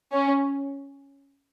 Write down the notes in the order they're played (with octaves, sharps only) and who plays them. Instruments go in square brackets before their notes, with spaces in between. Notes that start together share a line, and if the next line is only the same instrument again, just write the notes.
[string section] C#4